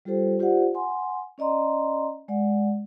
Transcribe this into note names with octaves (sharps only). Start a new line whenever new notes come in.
G3 F4 G4 A4 C5 G5
F4 G4 C5 D5 F#5
F#5 G#5 C6
C#4 D5 D#5 A#5 C6
G#3 D5 F#5